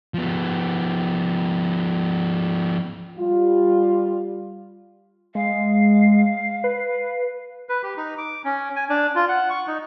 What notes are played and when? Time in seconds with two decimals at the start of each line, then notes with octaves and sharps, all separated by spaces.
0.14 F3 B3
3.18 G3 F4
5.35 G#3 F5
6.64 B4
7.69 B4
7.83 G4
7.97 D#4
8.18 D6
8.45 C#4
8.76 G#5
8.90 D4
9.15 F4
9.29 F#5
9.50 C#6
9.68 D#4